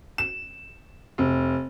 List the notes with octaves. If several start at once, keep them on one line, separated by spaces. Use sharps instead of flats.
E7
F1